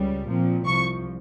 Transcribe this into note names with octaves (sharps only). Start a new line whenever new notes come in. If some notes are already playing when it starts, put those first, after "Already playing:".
Already playing: C#2 C#3 G3
A#2 F3 C4
C2 C3 F3 C#6